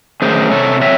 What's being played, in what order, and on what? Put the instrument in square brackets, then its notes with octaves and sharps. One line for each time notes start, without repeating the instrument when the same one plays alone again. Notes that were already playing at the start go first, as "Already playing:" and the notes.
[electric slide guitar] D#3 F#3 A3 C#4 G#4 C5
C3 A4 C#5
F#3 C4 C#5 E5